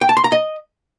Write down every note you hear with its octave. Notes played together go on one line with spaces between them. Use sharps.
G5
A5
C6
A#5
D#5